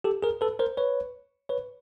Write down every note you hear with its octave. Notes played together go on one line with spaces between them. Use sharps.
G4 A4
G#4 A#4
A4 B4
A#4 C5
B4 C#5
B4 C#5